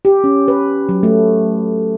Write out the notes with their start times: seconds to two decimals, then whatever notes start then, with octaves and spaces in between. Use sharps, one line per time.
0.05 G4
0.24 C#4
0.48 B4
0.89 F#3
1.03 A3